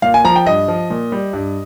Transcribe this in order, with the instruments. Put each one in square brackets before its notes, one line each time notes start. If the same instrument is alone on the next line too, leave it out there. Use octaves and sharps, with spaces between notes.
[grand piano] A#2 F5
G#5
F3 A#5
G5
G2 D#5
F3
A#2
G3
G2